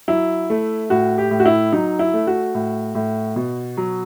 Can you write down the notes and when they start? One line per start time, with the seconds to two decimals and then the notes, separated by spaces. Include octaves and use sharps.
0.08 F#3 E4
0.50 A3
0.90 A2 F#4
1.18 G4
1.31 A2
1.40 F#4
1.46 E4
1.72 F#3 D#4
1.99 E4
2.14 A3
2.27 F#4
2.55 A2
2.95 A2
3.36 B2
3.77 F#3